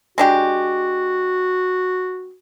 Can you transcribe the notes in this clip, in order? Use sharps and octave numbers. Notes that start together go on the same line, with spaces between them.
G#3 D4 F#4 G4